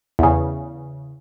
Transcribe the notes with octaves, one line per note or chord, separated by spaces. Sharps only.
E2 C#3